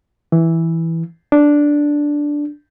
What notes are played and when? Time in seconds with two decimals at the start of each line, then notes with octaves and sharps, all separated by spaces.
0.32 E3
1.32 D4